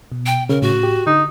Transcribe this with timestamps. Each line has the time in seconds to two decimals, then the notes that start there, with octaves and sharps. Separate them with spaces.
0.12 B2
0.26 G5
0.49 C#3 A#4
0.62 A2 F#4
0.83 G4
1.07 D3 D#4